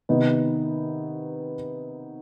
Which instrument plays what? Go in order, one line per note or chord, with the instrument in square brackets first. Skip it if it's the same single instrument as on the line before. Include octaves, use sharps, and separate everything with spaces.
[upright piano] C3 D#3 B3 D#4